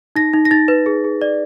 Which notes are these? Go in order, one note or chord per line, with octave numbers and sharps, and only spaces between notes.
D#4 A#6
D#4
A#6
D#4 A6
B4
G#4
G#4
D5